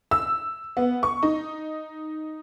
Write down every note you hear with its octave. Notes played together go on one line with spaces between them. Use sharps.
E6
B3
C#6
D#4